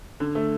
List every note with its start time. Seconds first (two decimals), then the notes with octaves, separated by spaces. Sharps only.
0.20 D3
0.35 A3